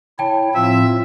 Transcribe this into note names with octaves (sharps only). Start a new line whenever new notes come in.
E4 C#5 G5 A5
A2 F3 C4 F4 E5